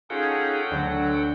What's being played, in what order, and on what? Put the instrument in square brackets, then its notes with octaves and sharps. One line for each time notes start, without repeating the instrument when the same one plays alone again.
[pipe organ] C#4 D#4 G#4 [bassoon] F4 [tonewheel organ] A4 F#5 G5
[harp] D2 [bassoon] D3 [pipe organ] F#3